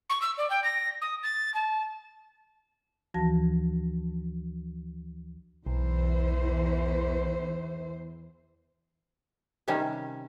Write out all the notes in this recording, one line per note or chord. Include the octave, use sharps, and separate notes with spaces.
C#6
E6
D5
G5
A#6
D#6
A6
A5
D2 E3 F3 F#4 A5 A#6
B1 E2 E3 C5
C3 D#3 G3 C#4